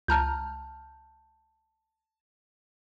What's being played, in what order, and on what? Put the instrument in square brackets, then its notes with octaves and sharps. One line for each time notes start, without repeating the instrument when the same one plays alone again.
[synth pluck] C#2 A#5 F6 [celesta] A5 G6